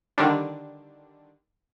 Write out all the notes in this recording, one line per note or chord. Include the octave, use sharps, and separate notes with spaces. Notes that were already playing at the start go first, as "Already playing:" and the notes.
D3 D#3 G3 D4